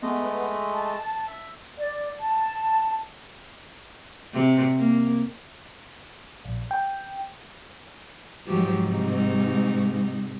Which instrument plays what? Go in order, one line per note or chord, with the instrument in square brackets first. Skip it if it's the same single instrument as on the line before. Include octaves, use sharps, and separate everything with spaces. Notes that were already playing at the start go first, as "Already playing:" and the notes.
[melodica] G#3 A3 D#5 [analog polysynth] B3
[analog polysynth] A5
[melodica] E5
[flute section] D5
A5
[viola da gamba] C3
A#3
[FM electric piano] A#1
G5
[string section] G#2 [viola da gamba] F3 F#3 G4
[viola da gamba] C3 D#4